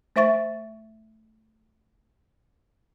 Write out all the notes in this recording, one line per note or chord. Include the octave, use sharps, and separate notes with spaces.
A3 C5 E5 C#6 A6